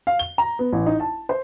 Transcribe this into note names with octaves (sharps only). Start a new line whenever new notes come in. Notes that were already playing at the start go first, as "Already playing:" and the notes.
F5
G7
A#5
B3
A1
D#4
A5
C5